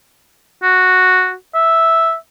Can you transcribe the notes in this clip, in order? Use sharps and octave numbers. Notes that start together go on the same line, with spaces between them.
F#4
E5